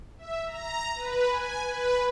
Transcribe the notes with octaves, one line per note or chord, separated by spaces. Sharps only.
E5
A#5
B4
G#5
B4